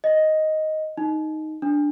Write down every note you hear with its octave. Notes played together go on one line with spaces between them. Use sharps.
D#5
D#4
D4